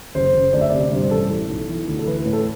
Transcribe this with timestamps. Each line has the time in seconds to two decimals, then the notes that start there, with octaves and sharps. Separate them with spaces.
0.15 F#1 C5
0.35 F#1
0.53 D2 D5
0.61 E5
0.70 C3 D5
0.91 G2 C5
1.11 A1 A4
1.29 E3 A4
1.49 B1
1.69 E3
1.87 D2
1.99 A4
2.07 E3 B4
2.26 A2
2.33 A4